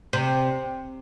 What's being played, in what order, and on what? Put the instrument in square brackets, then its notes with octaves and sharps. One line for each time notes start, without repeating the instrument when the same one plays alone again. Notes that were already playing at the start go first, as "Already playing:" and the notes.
[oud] C3